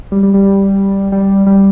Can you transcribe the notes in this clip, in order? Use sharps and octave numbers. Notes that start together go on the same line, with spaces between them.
G3
G3
G3
G3
G3